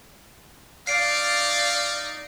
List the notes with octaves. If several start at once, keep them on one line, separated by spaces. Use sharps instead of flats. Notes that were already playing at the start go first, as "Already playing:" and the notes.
D#4 D5 F5 C7 D7